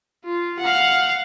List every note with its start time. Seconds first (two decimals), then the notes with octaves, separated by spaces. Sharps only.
0.24 F4
0.60 F5 F#5